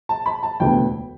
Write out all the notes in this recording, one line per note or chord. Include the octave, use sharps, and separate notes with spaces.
A5
B5
A5
E1 D2 D3 B3 G5